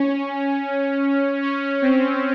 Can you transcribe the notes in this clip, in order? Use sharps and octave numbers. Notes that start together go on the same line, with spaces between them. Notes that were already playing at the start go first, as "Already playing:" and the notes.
Already playing: C#4
C#4
C4